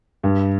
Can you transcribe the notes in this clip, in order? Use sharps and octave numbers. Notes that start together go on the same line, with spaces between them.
G2